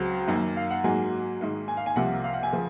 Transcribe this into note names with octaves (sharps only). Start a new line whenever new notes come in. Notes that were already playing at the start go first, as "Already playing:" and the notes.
Already playing: C#2 C#3 F#3 C4
F#2 D#3 A#3
F5
F#5
G#2 F#3 A#3 G#5
G#2 D#3 A#3
G#5
F5
G#5
C2 C3 F3 A#3 F#5
F5
F#5
G#5
C#3 F3